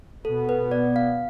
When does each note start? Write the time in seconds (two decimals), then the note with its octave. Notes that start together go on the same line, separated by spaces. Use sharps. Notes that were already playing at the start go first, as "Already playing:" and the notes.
0.25 B2 B3 A4
0.49 B4
0.71 D5
0.96 F5